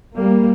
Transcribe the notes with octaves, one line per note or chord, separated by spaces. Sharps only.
G3 A#3